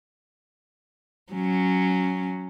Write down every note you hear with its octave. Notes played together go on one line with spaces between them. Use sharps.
F#3 C#4